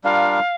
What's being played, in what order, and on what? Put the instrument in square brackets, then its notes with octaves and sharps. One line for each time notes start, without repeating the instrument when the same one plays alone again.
[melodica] G3 D4 F4 A#4 [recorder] F5